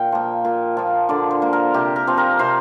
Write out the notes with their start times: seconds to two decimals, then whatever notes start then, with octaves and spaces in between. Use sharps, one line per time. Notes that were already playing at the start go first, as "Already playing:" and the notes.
Already playing: A#2 G5
0.12 F3 A#3
0.45 A#2
0.77 F3 A#3
1.09 D3 D5
1.31 C5
1.42 A#3
1.53 A#4
1.74 C3 G4
1.96 A#4
2.07 F3 C4
2.17 A#4
2.39 C3 C5